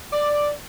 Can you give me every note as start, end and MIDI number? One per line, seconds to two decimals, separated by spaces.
0.13 0.49 74